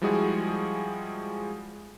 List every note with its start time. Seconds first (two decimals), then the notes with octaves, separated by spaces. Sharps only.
0.02 F3 G3 G#3 E4 F#4 G#4